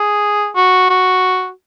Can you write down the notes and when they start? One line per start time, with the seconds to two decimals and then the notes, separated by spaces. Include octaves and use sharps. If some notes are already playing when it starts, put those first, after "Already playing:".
Already playing: G#4
0.55 F#4
0.90 F#4